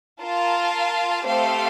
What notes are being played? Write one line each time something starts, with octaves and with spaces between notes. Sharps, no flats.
F4 A#4 F5 A5
A3 C4 G4 C5 F5